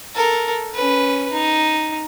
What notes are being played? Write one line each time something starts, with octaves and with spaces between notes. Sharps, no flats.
A4 A#4
C#4 B4
D#4